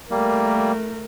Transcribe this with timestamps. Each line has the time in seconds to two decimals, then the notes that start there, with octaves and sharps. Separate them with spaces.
0.11 G3 A3 A#3 A#4